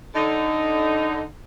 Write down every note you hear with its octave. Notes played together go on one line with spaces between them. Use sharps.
D3 D#4